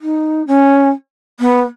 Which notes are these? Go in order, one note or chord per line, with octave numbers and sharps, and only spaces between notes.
D#4
C#4
B3